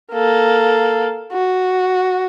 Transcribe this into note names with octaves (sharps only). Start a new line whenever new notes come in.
A#3 A4
F#4